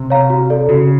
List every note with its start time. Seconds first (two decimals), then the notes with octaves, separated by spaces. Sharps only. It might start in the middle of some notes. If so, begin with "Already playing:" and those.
Already playing: C3
0.10 C#5 F5 A#5
0.30 F#4
0.50 A4 D5
0.69 C#3 F#4